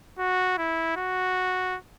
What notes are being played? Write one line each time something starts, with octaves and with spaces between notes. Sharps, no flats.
F#4
E4
F#4